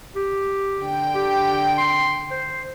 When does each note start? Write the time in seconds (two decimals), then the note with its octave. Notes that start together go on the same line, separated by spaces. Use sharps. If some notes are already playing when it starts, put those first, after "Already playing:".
0.16 G4
0.78 D3 G5
1.15 G4
1.78 C6
2.31 C5